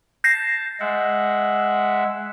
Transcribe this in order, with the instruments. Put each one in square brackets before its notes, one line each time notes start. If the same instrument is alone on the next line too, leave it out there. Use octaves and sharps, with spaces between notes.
[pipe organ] A5 [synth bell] G6 A#6 C7
[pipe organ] G#3 E5 F#5